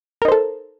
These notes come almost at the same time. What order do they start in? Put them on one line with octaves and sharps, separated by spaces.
A#4 D#4 C5 A4